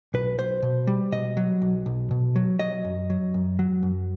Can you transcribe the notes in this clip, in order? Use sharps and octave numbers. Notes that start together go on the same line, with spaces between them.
B1 B4
B1 C5
B2
G3
B2 D#5
F#3
B1
B1
B2
F#3
F#3 D#5
F#2
F#3
F#2
F#3
F#2